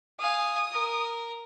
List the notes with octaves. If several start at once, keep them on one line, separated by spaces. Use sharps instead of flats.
F5 G#5 D#6
A#4